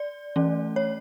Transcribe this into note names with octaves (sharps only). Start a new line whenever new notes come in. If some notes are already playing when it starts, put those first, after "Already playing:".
Already playing: D5
E3 A3 C#4
C#5